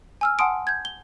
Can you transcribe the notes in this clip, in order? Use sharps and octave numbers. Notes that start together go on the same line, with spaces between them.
G#5 E6 F6
F#5 G#5 A5 C6 D#6 D7
G6 G#6
G7